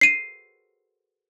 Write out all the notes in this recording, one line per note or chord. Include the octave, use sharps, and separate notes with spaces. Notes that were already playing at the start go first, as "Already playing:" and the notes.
C7 D#7